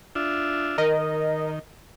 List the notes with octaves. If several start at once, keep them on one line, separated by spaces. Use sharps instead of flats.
D4 F4 E5
D#3 A#4 D#5